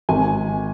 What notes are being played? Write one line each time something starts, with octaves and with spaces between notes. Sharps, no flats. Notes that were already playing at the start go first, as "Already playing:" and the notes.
G#1 G#5